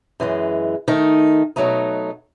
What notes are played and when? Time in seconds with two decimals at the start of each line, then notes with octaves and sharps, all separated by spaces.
0.20 F#2 E3 G#3
0.88 D#3 A3 D#4
1.56 B2 F#3 A3 D#4